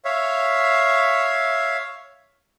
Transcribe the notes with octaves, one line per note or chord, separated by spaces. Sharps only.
C#5 E5 F5